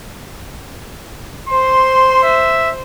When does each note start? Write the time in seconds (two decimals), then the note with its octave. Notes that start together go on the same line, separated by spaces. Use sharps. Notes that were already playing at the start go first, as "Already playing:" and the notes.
1.49 C5 C6
2.23 E5